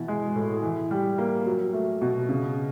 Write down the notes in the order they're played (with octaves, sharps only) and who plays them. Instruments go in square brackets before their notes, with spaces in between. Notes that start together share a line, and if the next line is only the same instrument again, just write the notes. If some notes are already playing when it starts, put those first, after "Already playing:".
Already playing: [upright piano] B2 E3
G#3
A2
E3
G3
A#3
F#3
A3
B2
C#3